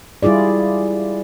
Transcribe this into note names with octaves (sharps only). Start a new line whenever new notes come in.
G3 E4 F4 G#4 D5